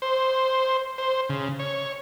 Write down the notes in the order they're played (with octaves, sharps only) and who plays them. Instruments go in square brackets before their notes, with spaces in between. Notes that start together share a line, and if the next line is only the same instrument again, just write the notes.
[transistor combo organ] C5
C5
C#3
C#5